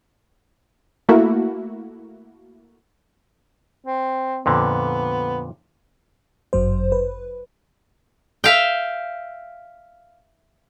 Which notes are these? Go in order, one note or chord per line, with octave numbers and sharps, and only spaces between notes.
A3 A#3 E4 F#4
C4
F2 A#2 D3 B3
G1 F#2 F#3 C5
B4
E5 F5 G5